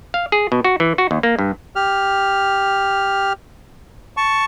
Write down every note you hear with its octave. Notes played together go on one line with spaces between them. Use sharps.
F5
G#4
B2
F#4
E3
F#4
D#2
A#3
G2
G4 F6
A5 C#6